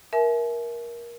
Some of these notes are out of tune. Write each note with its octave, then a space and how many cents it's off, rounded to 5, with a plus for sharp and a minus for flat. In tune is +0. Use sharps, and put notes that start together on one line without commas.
A#4 +20 E5 +0 G#5 +45